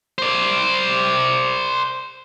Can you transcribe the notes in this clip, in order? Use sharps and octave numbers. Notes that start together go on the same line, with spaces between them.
C5 D5